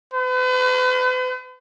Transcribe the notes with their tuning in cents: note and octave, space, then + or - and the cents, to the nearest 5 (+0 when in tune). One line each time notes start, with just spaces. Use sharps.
B4 +40